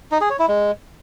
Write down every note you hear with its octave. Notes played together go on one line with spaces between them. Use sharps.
D#4
G#4
C#5
E4
G#3